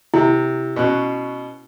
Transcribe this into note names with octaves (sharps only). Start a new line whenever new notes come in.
C3 E4
B2 C#4 F#6